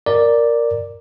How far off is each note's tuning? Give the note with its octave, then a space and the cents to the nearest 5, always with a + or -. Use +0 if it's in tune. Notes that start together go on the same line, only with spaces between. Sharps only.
A#4 +0 D5 +0